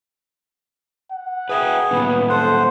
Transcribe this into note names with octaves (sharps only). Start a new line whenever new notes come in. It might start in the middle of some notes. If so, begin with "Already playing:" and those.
F#5
G#4 B4 E5 G5
D#3 A#3 B3 C#4
A4 C5 F#5